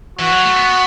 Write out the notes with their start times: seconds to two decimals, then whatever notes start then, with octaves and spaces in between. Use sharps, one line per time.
0.19 E3 F#4
0.32 F#3
0.45 A3
0.57 B3